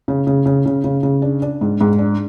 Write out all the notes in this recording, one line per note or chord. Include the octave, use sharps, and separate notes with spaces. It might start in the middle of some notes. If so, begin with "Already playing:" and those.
C#3
C#3
C#3
C#3
C#3
C#3
D4
D4
G#2
G#2
D4